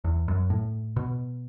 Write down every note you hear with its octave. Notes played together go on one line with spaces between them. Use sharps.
E2
F#2
A2
B2